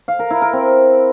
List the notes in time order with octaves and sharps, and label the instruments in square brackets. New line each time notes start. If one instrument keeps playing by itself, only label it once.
[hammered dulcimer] F5
A#4
E4
A#4
C4